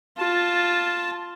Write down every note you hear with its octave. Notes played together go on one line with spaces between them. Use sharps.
F4 A5